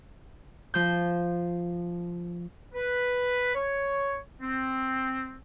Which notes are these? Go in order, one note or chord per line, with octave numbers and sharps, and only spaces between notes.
F3 G6
B4
C#5
C4